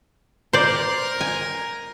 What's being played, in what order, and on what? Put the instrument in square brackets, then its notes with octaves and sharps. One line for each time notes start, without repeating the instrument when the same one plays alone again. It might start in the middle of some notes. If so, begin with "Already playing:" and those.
[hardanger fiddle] A#4 [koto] C5 D5
[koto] G#5